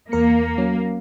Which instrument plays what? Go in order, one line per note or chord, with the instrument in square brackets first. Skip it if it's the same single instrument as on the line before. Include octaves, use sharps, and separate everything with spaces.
[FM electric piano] E2 A#4 C#7 [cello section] A#3
[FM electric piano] F#3 C#4